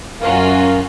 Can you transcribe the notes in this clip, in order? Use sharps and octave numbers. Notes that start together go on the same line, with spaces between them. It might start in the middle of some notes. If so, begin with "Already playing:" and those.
F#2 C#4 F4 F#4 A#4 F5